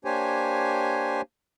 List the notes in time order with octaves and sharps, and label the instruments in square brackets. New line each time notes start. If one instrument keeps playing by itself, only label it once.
[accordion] A#3 D4 G4 C5 C#5 G#5